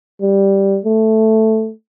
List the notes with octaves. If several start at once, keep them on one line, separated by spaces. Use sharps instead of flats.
G3
A3